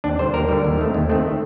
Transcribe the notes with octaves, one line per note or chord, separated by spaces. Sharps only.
D#2 D4
D3 G3 C5
D#2 A#4
D3 G3
D#2
D#3 A3 C4
D#2
D#3 A3 C4